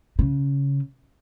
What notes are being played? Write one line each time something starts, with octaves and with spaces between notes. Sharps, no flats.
C#3